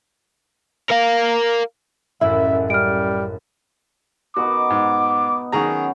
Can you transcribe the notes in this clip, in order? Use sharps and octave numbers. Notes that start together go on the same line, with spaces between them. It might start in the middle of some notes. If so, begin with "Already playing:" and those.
A#4 F5
A1 F#2 G#3 E4 E5
G3 F6 D7
B2 B3 D#4 F#4 D6
G#2
D#3 F#3 C#4 F#4 G#4 A#5